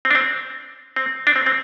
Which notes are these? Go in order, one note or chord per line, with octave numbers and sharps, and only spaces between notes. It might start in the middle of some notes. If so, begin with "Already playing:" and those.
C4
D4
C4
C4
D4
C4
C4